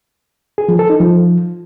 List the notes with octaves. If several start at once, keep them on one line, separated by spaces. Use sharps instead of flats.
G#4
F3
A4
D#4
F3